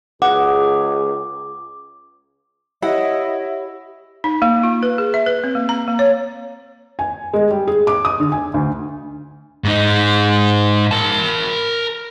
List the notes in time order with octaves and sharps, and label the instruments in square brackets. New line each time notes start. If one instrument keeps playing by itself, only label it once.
[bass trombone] C#2 [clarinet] G#4 [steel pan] F#5 [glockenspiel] D6
[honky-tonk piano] E4 [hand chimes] G4 C#5 [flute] D#5 [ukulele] F#5
[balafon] D#4
A#3
F4
B4
G#4
E5
B4
C4
A#3
A#5
A#3
C#5
[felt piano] G#5
G#3
G3
G#4
D6
D#6
D3
G#5
D2
[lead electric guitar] G#2 D#4
A#4 A5